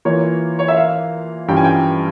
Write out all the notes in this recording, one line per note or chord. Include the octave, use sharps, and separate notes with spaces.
E3 A#3 F4 C#5
C#5
E5
F5
G2 E3 G3 C#4 F4 G5
G#5
G5